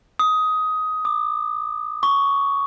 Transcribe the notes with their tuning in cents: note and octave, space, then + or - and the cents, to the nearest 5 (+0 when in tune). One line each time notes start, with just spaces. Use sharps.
D#6 +15
D6 +35
C#6 +10